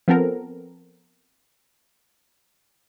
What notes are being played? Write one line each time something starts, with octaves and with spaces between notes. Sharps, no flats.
F3 B3 C4 A4 A#4